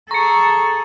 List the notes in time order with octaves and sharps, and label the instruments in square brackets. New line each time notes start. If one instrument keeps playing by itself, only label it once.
[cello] G#4 A4 [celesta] A#5 [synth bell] C#6 C#7